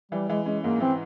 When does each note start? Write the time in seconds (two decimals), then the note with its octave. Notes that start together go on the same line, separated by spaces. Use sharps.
0.12 E3 G3
0.29 E3 G#3
0.46 G#3 C#4
0.64 G#2 A#3
0.80 E3 C4